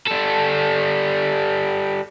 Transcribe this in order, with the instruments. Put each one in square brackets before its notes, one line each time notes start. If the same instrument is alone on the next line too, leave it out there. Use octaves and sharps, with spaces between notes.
[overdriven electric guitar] G3 A4